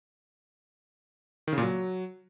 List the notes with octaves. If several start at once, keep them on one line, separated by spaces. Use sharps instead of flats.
D#3
C#3
A#2
F#3